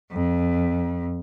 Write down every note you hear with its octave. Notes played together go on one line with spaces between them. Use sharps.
F2